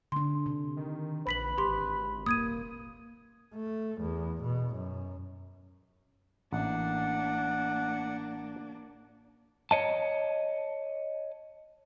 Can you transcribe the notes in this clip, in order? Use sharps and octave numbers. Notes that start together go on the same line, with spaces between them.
D3 D4 C6
C3
D#3
A#1 B4 B5 B6 F#7
G#1 G4 C6
D#1 A#3 D#6 G#6 D#7
A3
E2
B2
F#2
A1 A#3 D4 F#5
C#5 D#5 A5